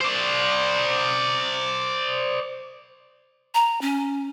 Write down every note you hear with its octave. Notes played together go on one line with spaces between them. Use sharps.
C5 D5
A#5
C#4